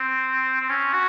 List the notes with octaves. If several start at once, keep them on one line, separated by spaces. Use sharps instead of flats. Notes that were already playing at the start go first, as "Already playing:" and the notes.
Already playing: C4
C4
C#4
F#4